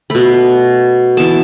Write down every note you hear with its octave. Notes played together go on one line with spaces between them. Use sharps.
B2 A3 B5
E3 B3 A5